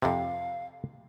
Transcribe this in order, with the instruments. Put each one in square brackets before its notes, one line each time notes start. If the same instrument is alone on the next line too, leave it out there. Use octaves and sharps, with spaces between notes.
[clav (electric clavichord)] F2 C3 [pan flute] F5